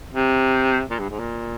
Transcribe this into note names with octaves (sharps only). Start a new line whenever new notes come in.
C3
A#2
G2
G#2
A#2